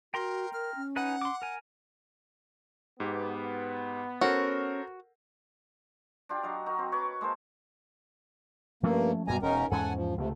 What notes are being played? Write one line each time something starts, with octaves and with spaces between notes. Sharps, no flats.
F#4 A#4 G5 A#5 C6
A#4 F6
C#4
D#4 B4 F#5 G#5
C6 D6
A#4 G#5
G#2 B3 G4
C#4 F#4 A4 A#4 C5 C#5
D4 F4 G4
F#3 D#5 F5
D#4 F#4 A#4
C4
B4 C#5 D6
G#3 A#3 A4 C5
G2 F3 A3 A#3 C#4
F#2 B2 G3 G#5 A#5
E1 C#4 D#4 A#4
E2 G#2 C#4 A4 F#5 G#5
F3
C#2 C3 A3